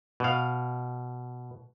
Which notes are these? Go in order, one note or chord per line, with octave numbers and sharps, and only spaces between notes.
B2 F5